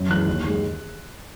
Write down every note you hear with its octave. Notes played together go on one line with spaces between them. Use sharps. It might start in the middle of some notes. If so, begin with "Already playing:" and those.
Already playing: F#2
E3 G#3 F#6
D#2
D#3 G#3